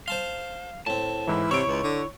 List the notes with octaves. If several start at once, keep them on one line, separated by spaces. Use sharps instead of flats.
C5 F5 A5 C6
A2 C4 A5
G#2 E3 E4
C3 E4 C#5 C#6 E6 D7
C#2
D3